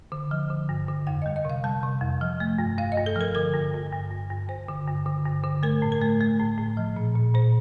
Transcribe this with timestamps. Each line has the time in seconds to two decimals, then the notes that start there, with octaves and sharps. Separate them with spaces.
0.12 D3
0.31 F3
0.50 D3
0.69 G2
0.88 D3
1.07 F2 G5
1.22 G3 D#5
1.36 D#5
1.45 C3 F5
1.64 G3 A5
1.83 C3
2.01 F2
2.21 F3
2.40 A3
2.58 G2
2.78 G2 F5
2.92 G2 D#5
3.06 A4
3.16 F3
3.21 A#4
3.35 D3 A#4
3.54 G2
3.74 G2
3.92 G2
4.11 G2
4.30 G2
4.49 G2 C5
4.68 D3
4.88 G2
5.06 D3
5.26 G2
5.44 D3
5.63 A3 A#4
5.82 A2
5.92 A#4
6.01 A3
6.21 A3
6.39 A2
6.58 A2
6.77 F3
6.96 A#2
7.15 A#2
7.35 A#2 C5